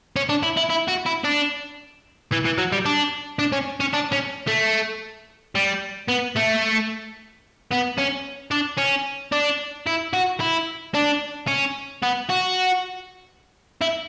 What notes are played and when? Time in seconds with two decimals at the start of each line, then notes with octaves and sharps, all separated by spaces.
0.16 C#4
0.29 D4
0.43 E4
0.57 E4
0.69 E4
0.88 F#4
1.06 E4
1.24 D4
2.32 E3
2.45 E3
2.58 F#3
2.73 G3
2.86 D4
3.39 D4
3.52 C#4
3.80 C#4
3.93 D4
4.12 C#4
4.47 A3
5.55 G3
6.09 B3
6.37 A3
7.71 B3
7.98 C#4
8.51 D4
8.78 C#4
9.32 D4
9.87 E4
10.13 F#4
10.40 E4
10.94 D4
11.47 C#4
12.02 B3
12.29 F#4
13.82 E4